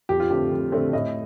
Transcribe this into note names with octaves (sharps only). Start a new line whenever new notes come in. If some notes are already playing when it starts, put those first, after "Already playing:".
F2 G4
F4
D3 A3 C4 G4
F2
D3 A3 C4
A2 D#5